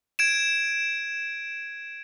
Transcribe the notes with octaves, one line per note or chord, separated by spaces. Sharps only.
G#6 D7 E7